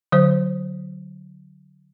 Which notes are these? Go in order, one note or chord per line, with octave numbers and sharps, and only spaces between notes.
D3 F#3 C5